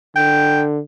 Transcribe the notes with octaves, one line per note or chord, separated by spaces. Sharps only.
D3 G5